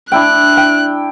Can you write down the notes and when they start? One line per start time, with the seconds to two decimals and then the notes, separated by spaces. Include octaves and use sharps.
0.12 D4 E4 G5 F#6
0.57 G5